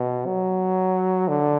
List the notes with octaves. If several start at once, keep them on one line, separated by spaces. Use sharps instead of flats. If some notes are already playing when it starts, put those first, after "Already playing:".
Already playing: B2
F#3
D3